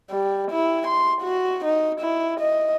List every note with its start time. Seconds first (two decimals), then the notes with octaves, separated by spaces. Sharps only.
0.10 G3
0.51 E4
0.87 C6
1.22 F#4
1.65 D#4
2.00 E4
2.40 D#5